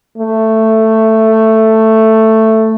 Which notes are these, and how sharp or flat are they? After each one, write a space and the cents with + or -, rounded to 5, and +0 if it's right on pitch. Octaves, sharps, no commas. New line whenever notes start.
A3 +10